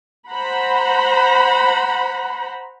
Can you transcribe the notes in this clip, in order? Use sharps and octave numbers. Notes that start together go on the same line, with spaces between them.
C5 F#5 A#5 B5